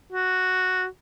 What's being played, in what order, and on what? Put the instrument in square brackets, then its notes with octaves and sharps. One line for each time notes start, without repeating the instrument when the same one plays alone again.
[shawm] F#4